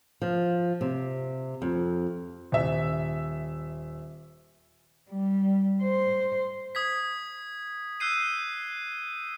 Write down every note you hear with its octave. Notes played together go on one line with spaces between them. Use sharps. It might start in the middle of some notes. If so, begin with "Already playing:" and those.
F3
C3
F2
D#1 E5
G3
C5
D#6 G#6 B6
E6 F#6 G6 C7 D#7